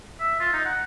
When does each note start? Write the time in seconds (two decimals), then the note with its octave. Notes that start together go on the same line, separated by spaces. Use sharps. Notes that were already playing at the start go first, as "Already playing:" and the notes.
0.20 E5
0.40 F4
0.53 D#4
0.65 F#5